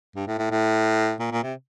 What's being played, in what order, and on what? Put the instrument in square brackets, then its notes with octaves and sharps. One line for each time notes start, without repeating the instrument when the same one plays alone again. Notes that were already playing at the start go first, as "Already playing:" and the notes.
[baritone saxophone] G2
A2
A2
A2
A#2
A#2
C3